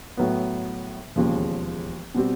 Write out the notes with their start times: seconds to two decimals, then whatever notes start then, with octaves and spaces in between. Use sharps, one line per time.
0.17 A2 F#3 B3
1.16 E1 D#2 C#3 F3
2.15 B2 G3 C4